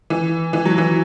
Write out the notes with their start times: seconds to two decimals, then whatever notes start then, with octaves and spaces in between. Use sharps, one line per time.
0.10 E3
0.53 E3
0.65 F#3
0.78 E3